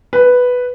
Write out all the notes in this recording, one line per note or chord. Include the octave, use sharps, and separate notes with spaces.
B4